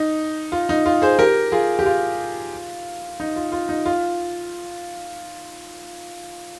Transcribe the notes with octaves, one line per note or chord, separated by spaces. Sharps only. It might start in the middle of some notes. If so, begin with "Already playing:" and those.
Already playing: D#4
F4
D#4
F4
G#4 C5
G4 A#4
F4 G#4
G4
F4
D#4
F4
F4
D#4
F4